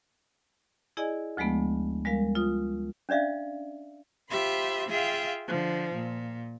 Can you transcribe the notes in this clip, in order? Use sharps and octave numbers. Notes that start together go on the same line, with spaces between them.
E4 G#4 D5 D#5 G#5
D2 F3 G#3 A3 B3
G3 G#3 A#4 F5
F4 D#6
C#4 D4 D5 E5 F5
F4 G4 C5 E5 B5 C6
F4 G#4 E5 F5 G5
D3 F3
A#2